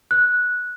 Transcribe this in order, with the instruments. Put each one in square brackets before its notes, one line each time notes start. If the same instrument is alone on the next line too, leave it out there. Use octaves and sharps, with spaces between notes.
[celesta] F#6